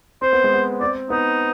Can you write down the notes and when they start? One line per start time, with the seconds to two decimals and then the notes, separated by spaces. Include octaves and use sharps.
0.22 C4 C5
0.33 B3
0.44 G#3
0.54 B3
0.81 C4 D5
1.10 B3 D#4